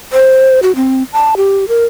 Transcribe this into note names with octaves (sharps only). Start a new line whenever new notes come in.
C5
F#4
C4
A5
G4
A#4